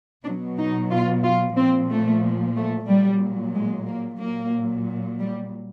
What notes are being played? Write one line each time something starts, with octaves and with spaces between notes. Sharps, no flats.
B2 D4
F#3
D#4
F4
F4
A#2 F3 C4
A3
A3
A#2 F#3 G3
G#3
A#3
A#2 F#3 A#3
G3